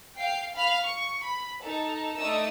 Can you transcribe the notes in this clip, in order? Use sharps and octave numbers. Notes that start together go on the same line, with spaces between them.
F5 G5 C7
F5 B5 F6
C#6
B5
D#4 A4
A3 D4 D#4 A4 D#6 E6